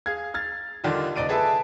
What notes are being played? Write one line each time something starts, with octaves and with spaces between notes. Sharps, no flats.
G#4 F5 G#6
F6 G#6 A6
D3 D#3 G3 D4 F4
F#1 D#4 D5 D7 D#7
G#4 A4 B4 E5 A5